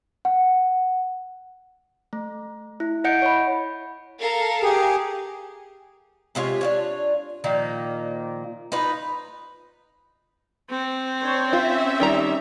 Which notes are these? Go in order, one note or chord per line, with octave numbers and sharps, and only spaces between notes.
F#5
A3
E4
E4 D#5 F#5 G6 C#7 D7
C#5 B5
A4 A#4 F5
G4 G#4
C3 G#3 F4 C#5
D4 F4 C#5
A#2 D#3 F3 A#3
D#4 F4 B4 D#5
C4
D4 C5 C#5
C#4 F4 E5
D#3 G3 A#5